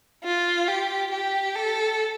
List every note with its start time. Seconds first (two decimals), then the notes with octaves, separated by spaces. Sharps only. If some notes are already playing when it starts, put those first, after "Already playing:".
0.24 F4
0.68 G4
1.11 G4
1.56 A4